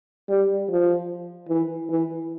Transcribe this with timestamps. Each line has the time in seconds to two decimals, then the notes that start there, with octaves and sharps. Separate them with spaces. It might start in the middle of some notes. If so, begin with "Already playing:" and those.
0.29 G3
0.69 F3
1.49 E3
1.90 E3